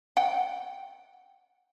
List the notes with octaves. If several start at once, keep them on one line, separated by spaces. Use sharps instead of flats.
F#5 G5